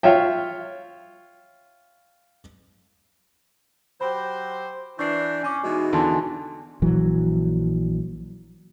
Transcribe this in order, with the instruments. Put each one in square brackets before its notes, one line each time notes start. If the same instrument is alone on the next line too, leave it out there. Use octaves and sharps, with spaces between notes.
[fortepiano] F4 C#5 E5 G5
[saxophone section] F#3 G4 C5 [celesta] B5
[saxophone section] E3 D4 [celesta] C#6 [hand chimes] G6 C7
[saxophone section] C#4 [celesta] G#5 C#6 D6
[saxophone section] B2 E3 G#3 [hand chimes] D#4 F#4
[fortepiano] E2 D3 [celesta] G#5 A5 C6
[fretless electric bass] A#1 E3 F#3